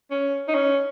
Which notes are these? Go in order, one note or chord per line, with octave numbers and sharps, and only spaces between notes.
C#4
D#4
C#4